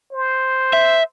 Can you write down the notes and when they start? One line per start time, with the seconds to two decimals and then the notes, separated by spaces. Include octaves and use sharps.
0.12 C5
0.73 E5